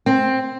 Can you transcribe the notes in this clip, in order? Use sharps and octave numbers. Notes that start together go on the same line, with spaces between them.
C4